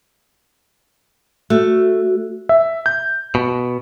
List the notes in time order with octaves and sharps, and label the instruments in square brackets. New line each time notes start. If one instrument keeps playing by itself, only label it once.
[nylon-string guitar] A3 [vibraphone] F#4
[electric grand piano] E5
G6
[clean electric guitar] B2